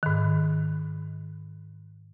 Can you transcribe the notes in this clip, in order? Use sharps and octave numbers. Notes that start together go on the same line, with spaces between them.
G#2 D#3